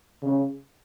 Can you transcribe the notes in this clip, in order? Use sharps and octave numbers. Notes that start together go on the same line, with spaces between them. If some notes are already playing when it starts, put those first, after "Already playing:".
C#3